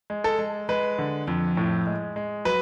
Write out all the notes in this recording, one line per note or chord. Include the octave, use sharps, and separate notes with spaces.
G#3
A4
G#3
G#3 B4
D3
F2
A2
G#3
G#3
F#3 B4